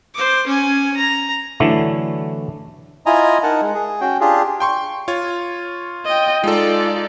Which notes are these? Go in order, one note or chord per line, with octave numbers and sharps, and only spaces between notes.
C5 D6
C#4 G#5
A#5
D3 E3 F#3 A3 D4 E4
E4 F4 D#5 G#5 A#5
D#4 A#4 F#5 A5
G#3
G#4
C#4 F#4 G5
D4 F4 G4 G#4
G5 C6 C#6
F4 C#5
D#5 G5
G#3 D#4 F4 A4 D5